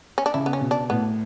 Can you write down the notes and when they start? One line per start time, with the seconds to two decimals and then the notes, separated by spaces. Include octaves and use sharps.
0.18 C#4
0.26 D4
0.34 C#3 E4
0.46 B3
0.53 C#4
0.61 B2
0.71 D4
0.90 A2 B3